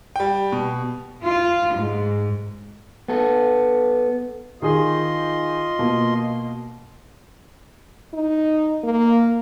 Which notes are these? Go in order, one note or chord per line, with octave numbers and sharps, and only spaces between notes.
G3 G5
B2
F4
G#2
B3 A4
D#3 D#4 F4 G#4 D#5 C6
B2 A#3
D#4
A#3